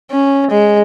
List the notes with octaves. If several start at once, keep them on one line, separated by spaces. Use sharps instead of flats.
C#4
G#3